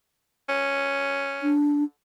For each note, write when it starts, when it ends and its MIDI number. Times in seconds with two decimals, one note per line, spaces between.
0.49 1.53 61
1.42 1.84 62